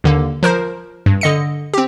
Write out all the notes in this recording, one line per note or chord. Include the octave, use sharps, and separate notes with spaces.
D#2 D3 A#3
F3 A#4 C5
G2
D3 D#5 C#7
C4 G4